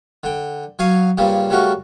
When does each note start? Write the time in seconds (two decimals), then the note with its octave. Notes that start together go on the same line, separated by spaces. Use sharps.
0.23 D3 G5
0.79 F#3 C#5 F5 D#6
1.17 G2 A#2 C#3 G3
1.50 C#3 G3 A3 F#4 A#4